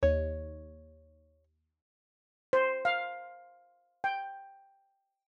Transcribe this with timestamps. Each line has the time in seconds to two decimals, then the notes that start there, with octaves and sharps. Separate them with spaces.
0.03 D#2 C#5
2.53 C5
2.85 F5
4.04 G5